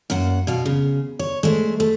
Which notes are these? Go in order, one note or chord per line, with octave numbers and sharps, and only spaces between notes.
F#2 A#3 F#5
B2 F5
C#3
C#5
G#3 A3 C5
A3